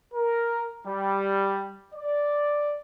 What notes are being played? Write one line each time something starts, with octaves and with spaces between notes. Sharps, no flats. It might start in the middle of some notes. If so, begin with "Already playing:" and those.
A#4
G3
D5